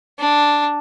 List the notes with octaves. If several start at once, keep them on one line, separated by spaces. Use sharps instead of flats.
D4